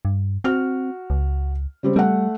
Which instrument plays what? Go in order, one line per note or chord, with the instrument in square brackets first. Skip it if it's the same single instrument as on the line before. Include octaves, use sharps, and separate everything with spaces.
[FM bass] G2
[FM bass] C4 [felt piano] F#4 F6
[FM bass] C#2
[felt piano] C#3 G3 C4
[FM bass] G3 [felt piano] A3 F#5